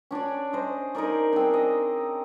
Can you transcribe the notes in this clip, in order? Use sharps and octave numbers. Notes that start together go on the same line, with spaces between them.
C#4 D4 C#5 D5
C5 D#5
D#4 G#4 A#4 D5
C4 D4
D#5